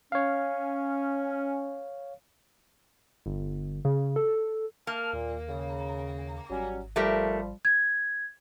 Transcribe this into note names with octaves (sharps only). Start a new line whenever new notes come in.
C#4 C#5 F5
G1
C#3
A4
A#3 A5 F6
D#2 A#2
C#3
G#1 F#3 G3 C#4
F3 G3 A3 G4 A#4
G#6